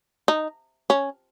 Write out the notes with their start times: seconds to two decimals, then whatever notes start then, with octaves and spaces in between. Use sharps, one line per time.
0.28 D#4
0.90 C#4